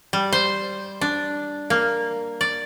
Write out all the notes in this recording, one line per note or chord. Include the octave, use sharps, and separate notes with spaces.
G3
C5
D4
A#3
D5